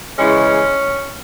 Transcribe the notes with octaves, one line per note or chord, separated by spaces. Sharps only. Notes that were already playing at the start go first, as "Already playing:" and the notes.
C#3 E3 G#3 C#4